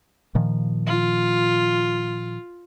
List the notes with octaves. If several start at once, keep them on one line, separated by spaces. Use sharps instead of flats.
A#2 D#3 F3
F4